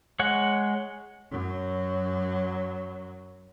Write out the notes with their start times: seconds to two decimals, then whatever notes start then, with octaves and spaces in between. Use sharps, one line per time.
0.19 G#3 C#5 F#5
1.30 F#2 F#3